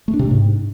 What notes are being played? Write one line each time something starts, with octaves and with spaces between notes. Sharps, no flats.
A3
D4
C3
D4
G#2